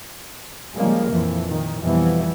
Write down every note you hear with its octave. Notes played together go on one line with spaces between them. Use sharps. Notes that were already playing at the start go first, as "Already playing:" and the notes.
C#3 F3 G3 G#3 A#3
F2 A#2 E3 F3
A#2 D#3
F2 B2 E3 F3 G3 B3